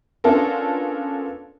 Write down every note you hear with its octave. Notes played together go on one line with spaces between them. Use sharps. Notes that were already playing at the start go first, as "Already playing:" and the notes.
B3 C#4 D4 F4 A4 A#4